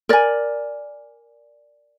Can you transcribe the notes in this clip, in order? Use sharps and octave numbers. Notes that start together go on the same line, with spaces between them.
A#4 D5 G#5